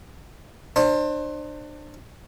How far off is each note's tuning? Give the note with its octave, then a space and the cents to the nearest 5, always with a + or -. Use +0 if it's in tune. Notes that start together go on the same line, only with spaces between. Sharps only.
D4 +35 C5 +25